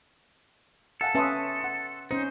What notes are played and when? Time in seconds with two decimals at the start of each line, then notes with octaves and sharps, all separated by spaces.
1.01 A4 F5 F#5 A5
1.15 C#4 B4 E5 A5 C6 D#6
1.60 F#5 C6
2.11 C#4 D#4 C5